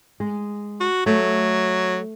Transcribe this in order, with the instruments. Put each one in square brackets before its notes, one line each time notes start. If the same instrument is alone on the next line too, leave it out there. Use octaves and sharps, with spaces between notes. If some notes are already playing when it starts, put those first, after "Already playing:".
[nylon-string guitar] G#3
[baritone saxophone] F#4
[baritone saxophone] F#3 [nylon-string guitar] A3